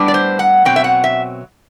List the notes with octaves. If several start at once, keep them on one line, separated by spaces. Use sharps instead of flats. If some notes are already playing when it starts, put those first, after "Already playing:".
Already playing: A2 G3 B3 D4
D5
C5
F#5
B2 F#3 C4 G5
E5
F#5
E5